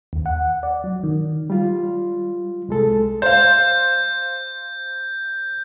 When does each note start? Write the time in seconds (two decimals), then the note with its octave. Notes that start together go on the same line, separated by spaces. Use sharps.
0.13 D#2
0.26 F#5
0.63 D5
0.84 F#3
1.03 D#3
1.50 G3 F4
2.69 C2 G#3 A4
3.22 C5 F5 G6